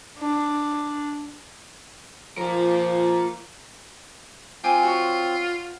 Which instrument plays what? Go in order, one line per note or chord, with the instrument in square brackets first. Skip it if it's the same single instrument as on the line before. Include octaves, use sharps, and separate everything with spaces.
[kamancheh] D4
[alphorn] F3 [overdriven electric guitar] F4 A#4
[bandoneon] C4 [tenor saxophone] F4 [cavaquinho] G5 G#5 D6
[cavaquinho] F#4 C#5